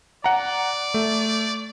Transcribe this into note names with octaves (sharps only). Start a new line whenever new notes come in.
D5 F#5 A#5
A3